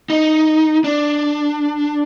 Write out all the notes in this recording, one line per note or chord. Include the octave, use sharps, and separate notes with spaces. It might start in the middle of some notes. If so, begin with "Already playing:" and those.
D#4
D4